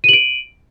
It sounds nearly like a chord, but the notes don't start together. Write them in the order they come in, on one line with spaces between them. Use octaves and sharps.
D#7 F#7 D7